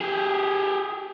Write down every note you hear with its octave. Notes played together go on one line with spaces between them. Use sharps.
G4 G#4